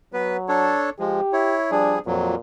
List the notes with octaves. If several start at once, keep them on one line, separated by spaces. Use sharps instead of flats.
F#3 B3 B4
D4 A4 C#5
F3 G#3 G4
E4 C#5
F3 G3 D4 G#4
F2 A#2 F#3